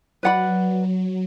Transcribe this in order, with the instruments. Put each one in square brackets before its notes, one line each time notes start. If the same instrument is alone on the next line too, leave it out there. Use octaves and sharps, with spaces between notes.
[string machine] F#3 [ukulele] B4 D5 F#5 B5